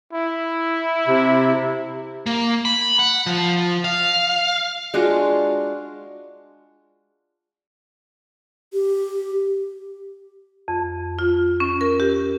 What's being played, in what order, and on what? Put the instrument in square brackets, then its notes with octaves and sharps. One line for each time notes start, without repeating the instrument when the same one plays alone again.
[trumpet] E4
[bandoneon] C3
[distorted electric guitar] A#3
B5
F#5
F3
F5
[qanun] G#3 D4 F4 F#4
[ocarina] G4
[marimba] F2
F4
C#4
A#4
G4